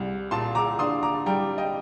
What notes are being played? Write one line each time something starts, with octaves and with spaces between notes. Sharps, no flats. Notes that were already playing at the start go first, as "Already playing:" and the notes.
Already playing: C2 G3
A#2 A5 C6
A#5 D6
D4 C6 D#6
A#5 D6
G3 G5 A#5
D#5 G5